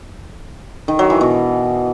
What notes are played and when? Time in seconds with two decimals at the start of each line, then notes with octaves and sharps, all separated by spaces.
0.88 D#3
0.99 F#3
1.10 E3
1.21 B2